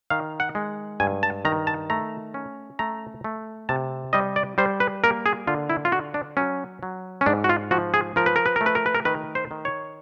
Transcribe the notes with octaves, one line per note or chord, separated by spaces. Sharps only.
D#3 F5
F#5
G#3
G2 G#5
A5
D#3 A#5
A5
A3 A#5
C#4
A3 A#5
A3
C3 A5
G3 D#5
D5
G3 C5
B4
A#3 A#4
G#4
D3 F4
E4
F4
D3 F#4
D4
F#3 C#4
F#3
C#4
G#2 D4
F#4
F4
F3 F#4
G#4
F3 A#4
B4
A#4
B4
A#4
A3
B4
A#4
B4
A#4
D#3 B4
C5
D#3
C#5